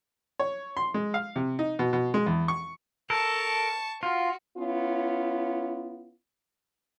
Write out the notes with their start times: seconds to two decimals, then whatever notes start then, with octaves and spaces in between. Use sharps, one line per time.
0.40 C#5
0.77 C6
0.94 G#3
1.14 F5
1.36 C3
1.59 D#4
1.79 B2
1.93 B2
2.14 G#3
2.26 E2
2.48 C#6
3.10 A4 A#4 A5 C#6
4.03 F4 F#4
4.57 B3 C#4 E4 F4